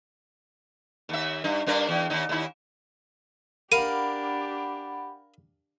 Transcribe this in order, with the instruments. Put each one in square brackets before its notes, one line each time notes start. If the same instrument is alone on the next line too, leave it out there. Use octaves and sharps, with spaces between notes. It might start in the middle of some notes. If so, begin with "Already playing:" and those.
[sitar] D#2 E5
G2 D#4
G2 D4 A#4
E2
D#2 D#4
D#2 E4
[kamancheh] D4 G4 [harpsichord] A#4 F5 [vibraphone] F#5 B5 [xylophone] D#7